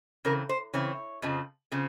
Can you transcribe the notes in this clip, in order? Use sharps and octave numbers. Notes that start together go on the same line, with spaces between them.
C#3 E3 C4 A#4
C5
C#3 E3 C4 C#5
F2 C#3 F3 C4
C#3 F3 C4